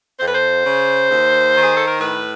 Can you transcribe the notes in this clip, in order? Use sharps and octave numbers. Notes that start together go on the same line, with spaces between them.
F2 C5
B4
C5
C#3
D#2
D#3
G#4
A4
A#4
A2 B4